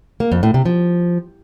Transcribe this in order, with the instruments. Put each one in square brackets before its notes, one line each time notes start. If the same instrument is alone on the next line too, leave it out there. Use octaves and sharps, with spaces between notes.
[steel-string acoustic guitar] A#3
F2
A2
C3
F3